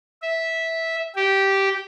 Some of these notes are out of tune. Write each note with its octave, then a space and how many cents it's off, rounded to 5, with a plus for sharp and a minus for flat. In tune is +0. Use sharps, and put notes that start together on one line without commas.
E5 -10
G4 -10